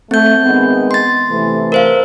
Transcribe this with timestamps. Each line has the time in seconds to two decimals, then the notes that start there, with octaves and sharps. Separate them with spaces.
0.11 A3 C4 G6
0.44 D#3 G#3 B3
0.91 C6 A6
1.30 C3 E3 A3
1.72 A#4 C5 F5